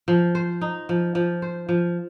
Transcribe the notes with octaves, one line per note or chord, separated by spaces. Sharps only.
F3
C5
D#4
F3
F3
C5
F3